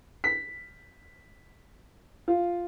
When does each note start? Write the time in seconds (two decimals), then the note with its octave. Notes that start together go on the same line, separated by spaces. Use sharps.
0.24 B6
2.28 F4